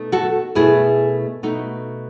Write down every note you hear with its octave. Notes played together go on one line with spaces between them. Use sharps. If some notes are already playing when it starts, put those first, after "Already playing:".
Already playing: B2 A3 D#4
F#4 A4
B2 A3 D#4 E4 G#4
B2 A3 D#4